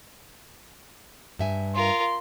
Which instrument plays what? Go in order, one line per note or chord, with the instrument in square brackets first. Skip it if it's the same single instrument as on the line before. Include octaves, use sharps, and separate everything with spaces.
[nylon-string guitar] G2 E5 G#5
[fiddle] F4 A#4 [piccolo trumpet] C6